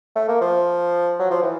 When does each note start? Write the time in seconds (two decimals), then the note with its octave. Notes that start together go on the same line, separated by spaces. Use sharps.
0.16 A3
0.28 A#3
0.41 F3
1.19 F#3
1.31 F3
1.43 E3